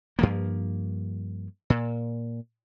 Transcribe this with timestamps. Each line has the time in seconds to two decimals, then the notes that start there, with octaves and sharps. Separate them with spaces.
0.19 G2 F3 A#3
1.70 A#2